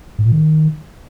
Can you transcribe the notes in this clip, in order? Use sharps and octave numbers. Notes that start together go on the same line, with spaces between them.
G#2
A#2
D#3